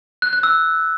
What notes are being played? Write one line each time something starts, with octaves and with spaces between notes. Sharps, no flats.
F#6
F#6
E6